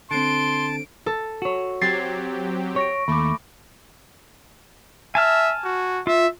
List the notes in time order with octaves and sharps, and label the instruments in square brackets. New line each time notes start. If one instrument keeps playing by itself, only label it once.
[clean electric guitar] D3 C4 [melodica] A5 [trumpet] C6 [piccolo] D7
[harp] A4
[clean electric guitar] F#4 C#5
[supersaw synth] F#3 C4 G4 [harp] G#6 A6 C7
[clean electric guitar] C#5 [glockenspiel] C#6 A#6 D7
[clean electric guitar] D#2 [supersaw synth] A3 [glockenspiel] B5 D6
[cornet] E5 [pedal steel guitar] G#5 A5 F6
[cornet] F#4
[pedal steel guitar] F4 [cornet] E5